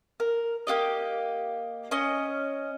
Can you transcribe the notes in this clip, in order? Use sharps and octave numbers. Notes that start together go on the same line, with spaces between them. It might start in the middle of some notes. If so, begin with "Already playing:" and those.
A#4
A#3 F4 G4 D#5
C#4 D#5